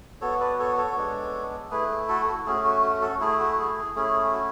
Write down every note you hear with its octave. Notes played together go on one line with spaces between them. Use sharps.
B3 F#4 A4 C#5
B4 D5
A4 C#5
A4 C#5
G#3 B3 D4
A3 E4 G#4 B4
F#4 A4
F#4
A3 C#4 F#4 G#4
F#4
F#4
F#4 A4
A3 E4 G#4
F#4
G#4
G#4
A3 C#4 E4 G#4
F#4